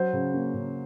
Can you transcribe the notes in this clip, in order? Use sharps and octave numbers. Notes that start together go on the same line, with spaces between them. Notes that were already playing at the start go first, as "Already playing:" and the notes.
Already playing: F#3 C5
C#3
A#3
C#3